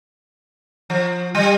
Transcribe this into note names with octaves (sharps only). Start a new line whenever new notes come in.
F3
G3